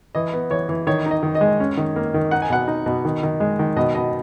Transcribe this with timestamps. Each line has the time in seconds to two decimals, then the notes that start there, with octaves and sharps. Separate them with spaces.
0.15 E3 D#5
0.33 B3
0.50 E3 C#5
0.69 E3
0.87 D#3 C#5
1.06 D#4
1.11 D#5
1.23 D#3
1.35 D#5
1.41 G#3
1.60 C#4
1.77 D#3
1.96 A#3
2.14 D#3
2.31 D#4 F#5
2.42 G#5
2.50 B2 F#5
2.68 D#4
2.86 B2
3.05 D#3
3.23 D#3
3.40 G#3
3.59 D#3
3.76 B2 D#5
3.95 B2 D#5